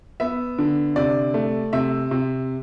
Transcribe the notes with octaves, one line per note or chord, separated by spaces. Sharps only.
B3 E5
D3
C3 D5
A3
C3 E5
C3